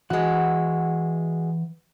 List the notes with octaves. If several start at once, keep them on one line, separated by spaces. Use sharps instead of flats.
E3 G#3 F#4 F#5